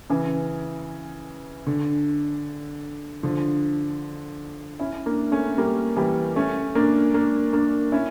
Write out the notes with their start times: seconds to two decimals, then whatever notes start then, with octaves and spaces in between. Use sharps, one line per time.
0.10 C#3 E3
1.67 D3
3.23 D3 F3
4.80 C#4 E4
5.06 A#3 D4
5.32 A3 C#4
5.58 G3 A#3
5.97 E3 G3
6.36 A3 C#4
6.75 A#3 D4
7.14 A#3 D4
7.53 A#3 D4
7.92 C#4 E4